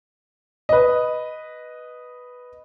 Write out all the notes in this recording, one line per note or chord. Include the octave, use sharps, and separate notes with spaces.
B4 D#5